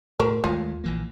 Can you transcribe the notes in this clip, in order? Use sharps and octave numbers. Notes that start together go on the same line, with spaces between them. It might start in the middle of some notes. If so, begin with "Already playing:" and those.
A2 F#4 A#4 C5
D#2 G#3 A3 F4
A#1 E3 A#3